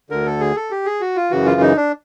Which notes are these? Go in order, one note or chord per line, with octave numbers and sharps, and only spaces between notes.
D2 D3 A#4
A4
G#4
A4
G4
G#4
F#4
F4
F#2 C#3 E3 F#4
F4
D#4
D4